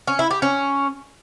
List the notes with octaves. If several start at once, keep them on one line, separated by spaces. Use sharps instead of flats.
C#4
E4
G4
C#4